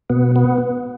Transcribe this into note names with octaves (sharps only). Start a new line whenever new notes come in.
B2 B3
B3